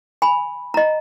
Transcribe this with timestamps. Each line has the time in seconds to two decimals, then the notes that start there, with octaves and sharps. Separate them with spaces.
0.22 G#5 B5
0.74 D#5 A#5